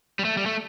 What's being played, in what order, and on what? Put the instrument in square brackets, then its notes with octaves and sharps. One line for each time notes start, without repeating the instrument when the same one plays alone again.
[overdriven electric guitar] G3
A3
G3
A3